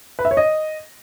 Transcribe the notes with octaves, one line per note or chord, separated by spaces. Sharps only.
B4
E5
C#5
D#5